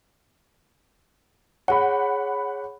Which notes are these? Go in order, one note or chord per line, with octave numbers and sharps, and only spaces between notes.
G#4 C#5 F#5 B5